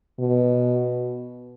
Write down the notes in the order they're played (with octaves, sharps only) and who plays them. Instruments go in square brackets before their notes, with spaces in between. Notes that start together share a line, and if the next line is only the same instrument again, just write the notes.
[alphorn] B2